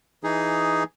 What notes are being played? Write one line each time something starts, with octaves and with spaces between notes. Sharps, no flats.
E3 D#4 G#4